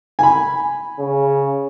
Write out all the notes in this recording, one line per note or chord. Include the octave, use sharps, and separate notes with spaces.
G#5 B5
C#3